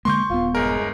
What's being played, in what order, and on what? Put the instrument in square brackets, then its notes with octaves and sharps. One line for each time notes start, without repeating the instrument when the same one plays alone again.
[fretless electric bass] D3 G#3 A#3 [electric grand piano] C6 C#6 G6
[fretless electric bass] D#1 B3 [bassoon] F4
[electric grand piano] G1 A#4 [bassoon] G#3